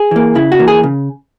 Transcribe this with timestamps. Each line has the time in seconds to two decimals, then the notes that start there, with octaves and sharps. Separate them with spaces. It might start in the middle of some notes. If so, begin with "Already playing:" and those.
Already playing: G#4
0.11 E3 A#3
0.35 C#3 E4
0.52 F#4
0.59 E3 A#3
0.68 G#4
0.83 C#3